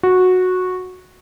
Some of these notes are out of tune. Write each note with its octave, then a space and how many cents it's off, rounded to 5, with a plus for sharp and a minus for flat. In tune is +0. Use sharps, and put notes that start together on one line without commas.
F#4 -10